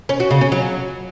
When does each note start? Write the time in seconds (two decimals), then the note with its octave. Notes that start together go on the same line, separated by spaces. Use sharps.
0.09 C#4
0.20 F#4
0.31 C#3
0.41 C#4
0.52 F#3